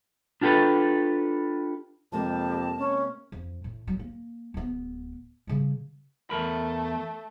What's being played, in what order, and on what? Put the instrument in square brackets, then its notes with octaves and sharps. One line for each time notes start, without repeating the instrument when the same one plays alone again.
[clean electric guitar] D4 F4 G4 A4 B4
[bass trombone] F2 [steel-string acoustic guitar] C3 G#3 A#3 [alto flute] G4 [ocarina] A5
[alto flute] C#4
[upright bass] F2
A2
F#3
A#3
D1 B3
C#3 G3
[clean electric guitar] E2 A#4 B5 [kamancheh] A3